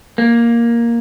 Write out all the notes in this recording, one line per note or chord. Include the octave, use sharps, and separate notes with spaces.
A#3